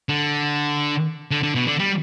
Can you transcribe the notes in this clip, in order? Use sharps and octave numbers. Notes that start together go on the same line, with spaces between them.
D3
D3
D3
B2
D3
G3